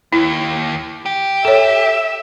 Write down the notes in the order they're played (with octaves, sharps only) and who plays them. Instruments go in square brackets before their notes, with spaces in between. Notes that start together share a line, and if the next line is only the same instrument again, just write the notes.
[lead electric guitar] D#2 [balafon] E4
[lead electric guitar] G4
[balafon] A4 C#5 [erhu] E5